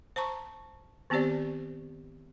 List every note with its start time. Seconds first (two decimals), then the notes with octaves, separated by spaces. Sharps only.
0.16 C5 A5 A#5 C#6
1.10 D#3 B3 C4 G4 C5 D5